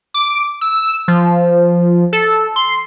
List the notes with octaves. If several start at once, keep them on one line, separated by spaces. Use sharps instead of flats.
D6
E6
F3
A4
C6